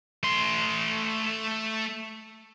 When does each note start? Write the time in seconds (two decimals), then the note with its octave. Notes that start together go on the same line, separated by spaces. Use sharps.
0.23 A3 C6